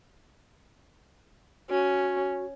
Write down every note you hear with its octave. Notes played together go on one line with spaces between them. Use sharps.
C#4 F#4